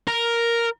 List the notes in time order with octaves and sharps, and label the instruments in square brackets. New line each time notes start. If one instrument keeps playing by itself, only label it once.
[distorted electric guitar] A#4